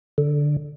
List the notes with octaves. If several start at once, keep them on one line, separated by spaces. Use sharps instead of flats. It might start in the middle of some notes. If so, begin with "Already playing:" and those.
D3